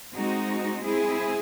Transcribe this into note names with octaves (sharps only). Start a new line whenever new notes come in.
G#3 C4 D#4 F#4
G#3 C4 E4 G#4